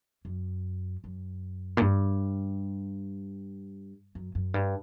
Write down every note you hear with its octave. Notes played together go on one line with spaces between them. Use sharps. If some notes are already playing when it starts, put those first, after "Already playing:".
F#2
F#2
A#2
G2
F#2
F#2
G2